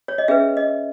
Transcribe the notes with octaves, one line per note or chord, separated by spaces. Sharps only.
C#5
D#5
C#4 G#4 B4 E5
D#5